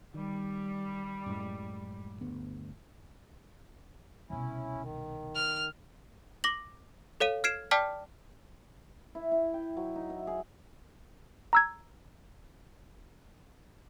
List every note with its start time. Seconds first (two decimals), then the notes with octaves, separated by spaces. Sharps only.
0.14 D#3 G3
1.26 F#2 A2 G#3
2.21 G1 D2 B3
4.30 C2 B2 C#4 E4
4.82 D#3
5.36 F6
6.44 D6 A#6 F#7
7.20 A4 C#5 F5 D#7
7.44 F6 G#6 C7 D7 E7
7.71 D5 G5 A5 D6 F6 B6
9.15 E4
9.32 E4
9.54 G5
9.77 F#3
9.96 D#4
10.10 E5
10.27 G#4
11.53 A#5 E6 G#6